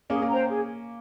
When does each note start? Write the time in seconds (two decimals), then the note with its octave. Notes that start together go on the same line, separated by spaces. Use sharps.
0.10 A#3 C#4 G#4
0.22 A#3
0.29 C5 G5 A#5
0.49 G#4